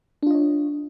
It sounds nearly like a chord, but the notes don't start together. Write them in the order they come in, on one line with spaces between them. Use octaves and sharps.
D4 F4 D#5 C#5